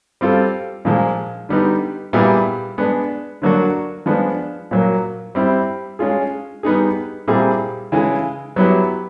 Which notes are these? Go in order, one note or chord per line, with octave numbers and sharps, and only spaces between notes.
G3 C4 F4 A4
A#2 F3 G#3
D3 G3 B3 D#4
A#2 G3 B3 E4 G#4
G#3 B3 D4
D3 F#3 A#3 D4 F#4
F3 G#3 B3 D4
A#2 F#3 A#3
G3 C4 E4
G#3 C#4 F4 G#4
G3 B3 D#4 G#4
A#2 G3 C4 E4 G#4
C#3 E3 G#3
F#3 B3 E4 G4